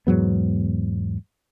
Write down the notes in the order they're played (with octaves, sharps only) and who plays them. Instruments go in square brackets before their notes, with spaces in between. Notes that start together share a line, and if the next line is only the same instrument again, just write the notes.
[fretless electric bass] E2 G#2 F#3 B3